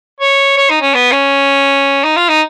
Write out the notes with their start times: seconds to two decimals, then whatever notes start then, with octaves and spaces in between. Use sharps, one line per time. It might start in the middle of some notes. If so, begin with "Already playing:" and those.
0.21 C#5
0.57 C#5
0.70 D#4
0.81 C#4
0.94 B3
1.12 C#4
2.04 D#4
2.17 F4
2.29 D#4